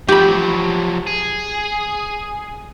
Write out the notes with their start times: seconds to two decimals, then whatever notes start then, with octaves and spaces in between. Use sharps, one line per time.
0.08 F3 F#3 G4 B5
1.07 G#4